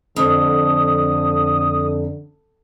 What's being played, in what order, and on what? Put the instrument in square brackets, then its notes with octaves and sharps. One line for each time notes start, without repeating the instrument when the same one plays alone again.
[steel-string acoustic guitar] F2 [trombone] D3 [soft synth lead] D#6